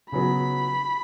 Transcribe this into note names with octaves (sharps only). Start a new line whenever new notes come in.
C#3 F#3 B3 B5